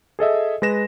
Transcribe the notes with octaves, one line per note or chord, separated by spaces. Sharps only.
G#4 A4 D#5 E5
G#3 B4 A#6 E7